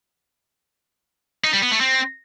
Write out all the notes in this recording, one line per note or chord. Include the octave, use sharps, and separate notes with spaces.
D#4
G3
B3
A3
C4